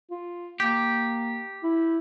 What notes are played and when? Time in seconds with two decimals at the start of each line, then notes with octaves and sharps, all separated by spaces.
0.11 F4
0.60 A#3 G4
1.63 E4